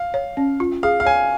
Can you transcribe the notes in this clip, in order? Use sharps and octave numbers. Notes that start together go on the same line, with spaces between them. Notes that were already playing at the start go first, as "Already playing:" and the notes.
Already playing: F5
C#5
C#4
F4
G#4 F5
F5
C#5 G#5